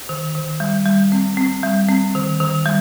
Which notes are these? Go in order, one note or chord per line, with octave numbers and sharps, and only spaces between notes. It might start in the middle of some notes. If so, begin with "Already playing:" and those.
D#3
D#3
G3
G3
C4
C4
G3
C4
D#3
D#3
G3